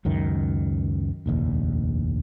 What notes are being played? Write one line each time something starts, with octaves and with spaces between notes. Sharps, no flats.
C#2 F#2 D#3
F1 A#1 D#2